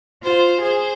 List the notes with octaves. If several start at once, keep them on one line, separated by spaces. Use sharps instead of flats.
F4 C5
G#4 C5